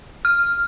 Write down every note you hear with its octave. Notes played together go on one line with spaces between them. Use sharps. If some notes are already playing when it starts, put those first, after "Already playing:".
F6